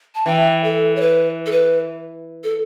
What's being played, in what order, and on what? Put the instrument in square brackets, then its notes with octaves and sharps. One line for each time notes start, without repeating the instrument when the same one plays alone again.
[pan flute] A5
[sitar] E3 [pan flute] G5
[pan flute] A4
C#5
B4
A4
B4
A4